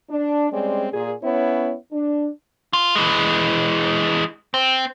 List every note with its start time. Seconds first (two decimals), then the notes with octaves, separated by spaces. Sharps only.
0.10 D4
0.51 G3 G#3 C4 C#4 D5
0.93 A#2 G#4
1.23 B3 C#4 E4 C#5
1.93 D4
2.73 F4
2.96 E3 G#3
4.54 C4